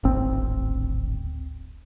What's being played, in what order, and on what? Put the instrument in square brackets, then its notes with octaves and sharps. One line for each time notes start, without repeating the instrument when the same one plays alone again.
[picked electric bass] D1 G#1 C4